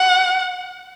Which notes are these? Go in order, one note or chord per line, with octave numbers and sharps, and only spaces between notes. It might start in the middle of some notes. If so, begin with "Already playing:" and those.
Already playing: F#5